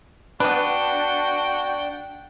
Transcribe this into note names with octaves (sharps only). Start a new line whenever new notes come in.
B3 D4 F#4 B4 F#5 G5